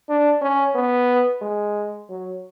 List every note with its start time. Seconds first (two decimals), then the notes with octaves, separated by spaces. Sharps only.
0.09 D4
0.42 C#4
0.75 B3
1.42 G#3
2.09 F#3